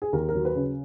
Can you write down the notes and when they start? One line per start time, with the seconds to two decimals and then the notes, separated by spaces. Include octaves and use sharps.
0.02 G#4
0.13 D#2 A#4
0.29 A#4
0.34 F#3
0.45 B4
0.56 C#3